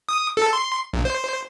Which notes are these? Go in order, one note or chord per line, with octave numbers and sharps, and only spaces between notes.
D#6
A4
C6
A#1
C5